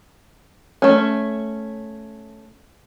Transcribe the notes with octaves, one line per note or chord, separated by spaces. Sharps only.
A3 C#4